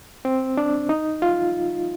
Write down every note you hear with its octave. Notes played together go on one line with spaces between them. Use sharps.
C4
D4
D#4
F4